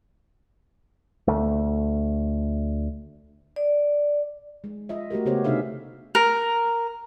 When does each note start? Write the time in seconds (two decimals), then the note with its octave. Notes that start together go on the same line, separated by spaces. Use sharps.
1.28 D2 A3
3.56 D5
4.64 G#3
4.89 F4 D#5 E5
5.10 A3 F#4 G4 A#4
5.25 C#3 B3 F#4 G4 C5 C#5
5.44 C3 D4 D#4 G#4 E5 F5
6.15 A#4